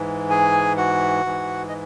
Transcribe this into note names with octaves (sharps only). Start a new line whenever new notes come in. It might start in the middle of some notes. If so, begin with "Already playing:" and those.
Already playing: G#2 E3
G#4 G#5
F#4 F#5
G#2 E3
D#5